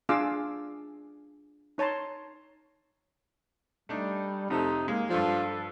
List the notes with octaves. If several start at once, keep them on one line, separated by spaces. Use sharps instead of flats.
D4 F4 G#4 F5 D6 E6
D#4 C#5 A5 A#5 C6
G3 A3 D4 D#4
F2 C3 A3 D#4 A4
G#3 A#3
G2 F3 D4 A4